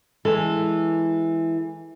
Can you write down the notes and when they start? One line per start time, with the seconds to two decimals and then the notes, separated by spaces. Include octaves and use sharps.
0.25 E3 G#3 A4